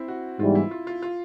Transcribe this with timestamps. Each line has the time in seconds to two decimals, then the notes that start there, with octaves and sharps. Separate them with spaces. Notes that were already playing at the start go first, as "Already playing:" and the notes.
Already playing: C4 E4
0.08 F#4
0.40 G#2 E3 G3 B3 F4
0.55 E4
0.71 F4
0.87 F4
1.02 F4